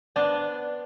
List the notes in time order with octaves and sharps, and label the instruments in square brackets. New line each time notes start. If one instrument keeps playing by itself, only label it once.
[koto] B3 D4 C5 [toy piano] D5